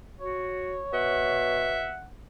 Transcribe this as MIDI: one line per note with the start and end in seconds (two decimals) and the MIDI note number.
0.19 0.80 66
0.19 1.83 73
0.93 1.95 47
0.93 1.97 76
0.93 2.06 78